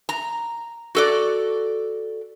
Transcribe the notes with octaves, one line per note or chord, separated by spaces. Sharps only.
A#5
F#4 A4 D5